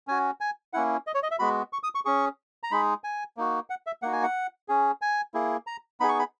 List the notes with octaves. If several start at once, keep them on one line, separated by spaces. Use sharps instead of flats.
C#4 F#4 G#5
G#5
A#3 C#4 E4 F#5
D#5
C#5
D#5
E5
G#3 B3 F#4 B5
C#6
D#6
C#6
C#4 G#4 C#6
A#5
G#3 D#4 G#4 B5
G#5
A#3 D#4 F#4
F#5
E5
A#3 D#4 F#4 F#5
G#5
F#5
C#4 G#4
G#5
A#3 E4 G#4
A#5
B3 D#4 G#4 B5
C#6
B5